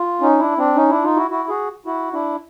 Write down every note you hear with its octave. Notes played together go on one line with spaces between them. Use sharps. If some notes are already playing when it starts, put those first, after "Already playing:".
Already playing: F4
C#4 D#4
D4 E4
C4 D4
C#4 D#4
D4 E4
D#4 F4
E4 F#4
E4 F#4
F#4 G#4
E4 F#4
D4 E4